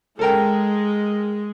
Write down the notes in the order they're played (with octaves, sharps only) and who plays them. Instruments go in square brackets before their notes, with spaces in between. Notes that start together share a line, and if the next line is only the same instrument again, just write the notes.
[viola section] G#3 [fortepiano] A4 A#4 G5